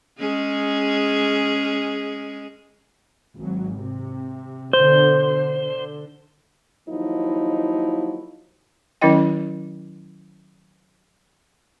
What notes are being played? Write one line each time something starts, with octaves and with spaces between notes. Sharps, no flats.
G#3 C#4 G#4
G#1 F#3
C3
B2 D3 C5
D3
D#2 F3 F#3 D#4 E4
D#3 F#3 C#4 E4 D#5 G5